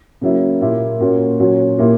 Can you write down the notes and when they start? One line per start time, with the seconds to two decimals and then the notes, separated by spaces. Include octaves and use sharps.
0.21 C#3 F#3 A#3 E4
0.61 A#2 A#3 E4 G4
1.00 A#2 A#3 C#4 F#4
1.40 A#2 F#3 C#4 F#4
1.78 A#2 A#3 E4 G4